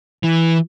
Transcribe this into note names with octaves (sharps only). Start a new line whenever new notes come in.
E3